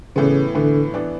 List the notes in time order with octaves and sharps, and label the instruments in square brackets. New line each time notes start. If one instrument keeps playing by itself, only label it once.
[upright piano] A2 E3 B3 [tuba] C#3
[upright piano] A2 E3 B3 [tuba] D3
[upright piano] E3 B3 D4